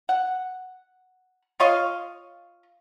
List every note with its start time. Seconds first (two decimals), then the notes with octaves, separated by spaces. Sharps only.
0.09 F#5
1.60 F4 C#5 D#5 F5